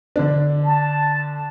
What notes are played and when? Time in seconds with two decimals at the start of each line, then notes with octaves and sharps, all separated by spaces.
0.16 D3 D4
0.63 A5